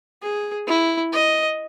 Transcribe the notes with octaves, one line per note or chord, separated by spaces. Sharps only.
G#4
E4
D#5